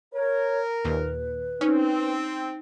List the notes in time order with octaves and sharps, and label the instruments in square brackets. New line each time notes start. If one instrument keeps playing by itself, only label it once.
[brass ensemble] A#4 [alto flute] C#5
[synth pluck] D#2 A#2 [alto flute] B4
[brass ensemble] C4 [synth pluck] C#4 [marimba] D#4